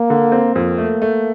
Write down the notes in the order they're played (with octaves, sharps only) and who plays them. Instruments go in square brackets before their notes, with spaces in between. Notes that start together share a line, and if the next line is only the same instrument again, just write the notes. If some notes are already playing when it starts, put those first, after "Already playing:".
Already playing: [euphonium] A#3
[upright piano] D3
C4
[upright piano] F2 [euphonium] A#3
[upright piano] A3
A3